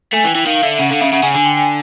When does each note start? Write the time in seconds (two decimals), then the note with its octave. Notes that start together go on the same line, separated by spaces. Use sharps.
0.13 A3 G#5
0.24 E3 G5
0.35 E3
0.46 D#3 F5
0.63 D3 E5
0.79 C#3 F#5
0.91 D3 F5
1.01 C#3 E5
1.12 C#3 F#5
1.23 C#3 G#5
1.35 D3 G#5
1.45 G5
1.57 G#5